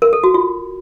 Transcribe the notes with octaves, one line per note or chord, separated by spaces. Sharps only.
A#4
A4
F#4
F4